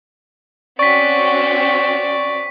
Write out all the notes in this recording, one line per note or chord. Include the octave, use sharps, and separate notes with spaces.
C4 C#4 F#4 D5 C#6 B6